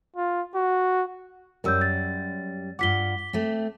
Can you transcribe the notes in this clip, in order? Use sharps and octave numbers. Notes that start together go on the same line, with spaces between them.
F4
F#4
F#2 G3 A#4 E6 G6
A6
G2 F4 F#5 D6 B6 G7
A3 C4